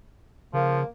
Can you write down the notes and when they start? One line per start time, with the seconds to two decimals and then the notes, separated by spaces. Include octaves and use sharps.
0.54 C#3 F3 A#3